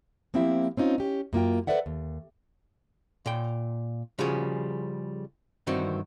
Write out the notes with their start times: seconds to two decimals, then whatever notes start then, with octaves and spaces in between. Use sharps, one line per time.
0.34 F3 A#3 C4 E4 G4 E5
0.77 C4 C#4 D#4 F4
0.98 C#4 G4
1.33 F#2 A#3 F4 G5
1.67 A4 B4 C5 D5 E5 F#5
1.86 D#2
3.26 A#2 G5
4.19 C#3 F3 G3 F#4 G#4
5.67 G2 D#3 E3 C4 F#4